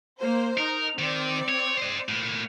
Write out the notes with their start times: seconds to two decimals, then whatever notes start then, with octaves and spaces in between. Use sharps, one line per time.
0.20 A#3 C5
0.58 D#4 A#4
0.99 D#3 C4 D5
1.49 C#5
1.77 C5 D#5
2.09 A2 A#3